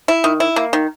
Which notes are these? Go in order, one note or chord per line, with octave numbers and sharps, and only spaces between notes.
E4
D#3
E4
A#3
D#3